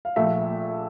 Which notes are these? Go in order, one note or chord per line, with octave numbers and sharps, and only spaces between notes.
F5
A#1 A#2 A3 E5